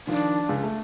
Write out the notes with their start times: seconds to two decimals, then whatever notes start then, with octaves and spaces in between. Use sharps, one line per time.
0.07 D#3 F3 D4
0.49 C#2
0.63 A3